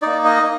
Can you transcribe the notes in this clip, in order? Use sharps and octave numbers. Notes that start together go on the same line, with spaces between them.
A#3 D#4 D5
D#5